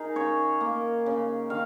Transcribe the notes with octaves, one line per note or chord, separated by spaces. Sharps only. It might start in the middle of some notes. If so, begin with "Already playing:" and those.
Already playing: D#4 G#4 A#4
C#3 C#5
A#3
C#3
D#3 F5